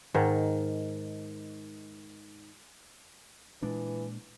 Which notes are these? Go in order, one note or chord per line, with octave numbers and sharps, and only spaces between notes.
G#2 D#3
A#2 E3 G#3 D4